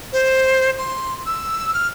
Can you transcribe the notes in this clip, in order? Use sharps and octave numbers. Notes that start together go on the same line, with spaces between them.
C5
C6
E6
F6